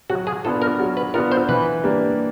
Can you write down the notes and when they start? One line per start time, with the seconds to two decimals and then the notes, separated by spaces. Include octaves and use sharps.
0.10 F#3 F#4
0.27 G#4
0.45 B3 D4 F4 A4
0.62 A#4
0.79 F#3
0.97 B4
1.14 B3 D4 F4 A#4
1.32 C5
1.49 E3 B4
1.83 G3 A#3 D4 G4